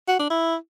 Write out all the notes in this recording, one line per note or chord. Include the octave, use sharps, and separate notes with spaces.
F#4
D4
E4